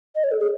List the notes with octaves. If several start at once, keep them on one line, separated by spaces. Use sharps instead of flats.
D#5
C#5
A4
G#4